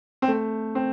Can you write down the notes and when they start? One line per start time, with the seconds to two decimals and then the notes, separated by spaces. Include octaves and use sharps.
0.22 C4
0.28 A3
0.75 C4